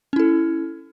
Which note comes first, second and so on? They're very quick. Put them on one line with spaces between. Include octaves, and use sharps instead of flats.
C#4 E4 A4